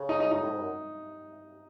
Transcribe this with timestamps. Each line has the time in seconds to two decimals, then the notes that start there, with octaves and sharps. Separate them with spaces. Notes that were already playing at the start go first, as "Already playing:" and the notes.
Already playing: C#3
0.09 D#4
0.20 D#4
0.32 D#4
0.43 A2
0.51 G#2
0.60 F#2